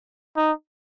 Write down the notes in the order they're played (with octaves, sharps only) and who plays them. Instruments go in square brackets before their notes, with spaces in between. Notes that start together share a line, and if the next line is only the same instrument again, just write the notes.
[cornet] D#4